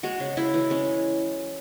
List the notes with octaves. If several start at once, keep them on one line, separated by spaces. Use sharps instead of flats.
G#3 F#4
C#3
C#3 E4
E3
G#3 C#4